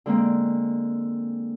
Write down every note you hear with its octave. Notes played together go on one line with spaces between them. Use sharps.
D3 G#3 A#3 C4